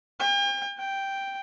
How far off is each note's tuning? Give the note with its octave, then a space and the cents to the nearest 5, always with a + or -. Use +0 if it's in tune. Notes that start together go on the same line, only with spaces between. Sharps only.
G5 +40
G5 +0